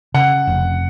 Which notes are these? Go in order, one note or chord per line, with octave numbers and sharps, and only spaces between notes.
C#3 F#5
F1